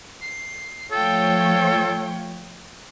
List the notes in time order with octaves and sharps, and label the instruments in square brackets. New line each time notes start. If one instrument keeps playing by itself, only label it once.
[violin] C7
[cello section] F3 A3 C#5 [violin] F4 G5 [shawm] A4